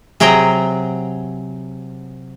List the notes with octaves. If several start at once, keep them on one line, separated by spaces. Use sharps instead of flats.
C3 F#3 G#4 G5 A#5